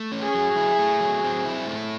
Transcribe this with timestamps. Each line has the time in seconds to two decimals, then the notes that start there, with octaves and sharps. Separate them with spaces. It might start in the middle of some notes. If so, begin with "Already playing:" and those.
Already playing: A3
0.12 C#4
0.23 G#4
0.35 F#3
0.56 E4
0.79 A3
1.00 F#3
1.23 C4
1.45 E4
1.67 A3